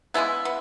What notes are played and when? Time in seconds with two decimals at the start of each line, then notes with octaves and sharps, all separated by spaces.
0.14 C#3 G#3 B3 E4
0.45 B3